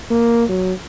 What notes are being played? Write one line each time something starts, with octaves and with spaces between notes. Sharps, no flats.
A#3
F#3